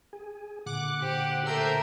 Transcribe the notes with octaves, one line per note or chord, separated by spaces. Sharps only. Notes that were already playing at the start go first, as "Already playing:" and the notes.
G#4 G#5
A#2 D3 F#5 D6 F#6
G4 C5
A3 A#4 C5 E6 G6